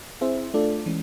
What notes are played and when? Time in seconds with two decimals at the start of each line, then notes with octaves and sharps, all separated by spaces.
0.21 C4 E4 G#4 C5 E5
0.54 A3 D4 F4 A4 D5
0.86 E3 G#3 C#4